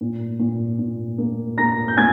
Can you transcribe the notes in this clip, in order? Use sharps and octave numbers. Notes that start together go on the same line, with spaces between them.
A#2
A#2
A#2
A#3
A#3 A#5 A#6
G6
A#3 G#5 G#6